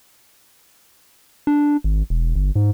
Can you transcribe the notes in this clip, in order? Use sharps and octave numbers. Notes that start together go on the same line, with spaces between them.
D4
G#1
E1
G1
G#2